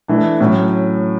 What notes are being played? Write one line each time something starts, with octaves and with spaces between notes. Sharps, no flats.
E3 A3 D4
A2 F#3 C#4